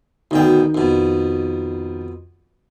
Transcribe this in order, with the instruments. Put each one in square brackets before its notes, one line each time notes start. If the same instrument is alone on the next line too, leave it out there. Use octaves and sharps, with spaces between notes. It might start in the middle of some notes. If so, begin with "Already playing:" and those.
[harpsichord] D2 B2 G5 [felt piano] D#3
[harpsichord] F2 B2